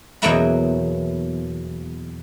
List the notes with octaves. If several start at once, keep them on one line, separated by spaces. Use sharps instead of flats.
E2 B2 F#3 A#3 E4 F#5